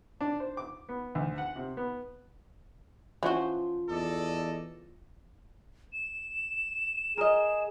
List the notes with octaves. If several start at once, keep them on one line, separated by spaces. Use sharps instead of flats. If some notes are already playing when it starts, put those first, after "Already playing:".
D4
C5
D6
B3
D2
F#5
C3
B3
E3 F3 C#4 F#4 C5
E2 A4 D5 D#5
E7
G#4 A#4 D#5